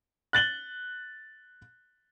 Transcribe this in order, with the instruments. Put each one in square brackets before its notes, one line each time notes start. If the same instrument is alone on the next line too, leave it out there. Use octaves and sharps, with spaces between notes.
[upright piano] F#6 A6 F#7 G7